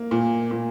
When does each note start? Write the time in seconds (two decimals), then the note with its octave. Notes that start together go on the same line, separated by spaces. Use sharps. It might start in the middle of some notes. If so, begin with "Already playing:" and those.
Already playing: A#3
0.11 A#2
0.51 A#2